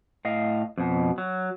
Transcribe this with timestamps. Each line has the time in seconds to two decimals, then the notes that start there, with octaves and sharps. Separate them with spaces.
0.25 A2 D#5 F5
0.78 F2 B2
1.18 F#3